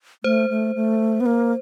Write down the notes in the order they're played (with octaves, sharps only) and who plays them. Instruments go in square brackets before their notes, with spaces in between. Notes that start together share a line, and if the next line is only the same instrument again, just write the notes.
[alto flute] A3 [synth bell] C5
[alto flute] A3
A3
B3
A#3